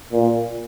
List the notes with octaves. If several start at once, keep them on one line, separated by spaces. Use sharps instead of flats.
A#2